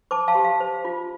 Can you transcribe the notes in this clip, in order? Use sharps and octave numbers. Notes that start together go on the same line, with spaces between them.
C5 A5 D6
F5 A5
G4
F5
C5
F4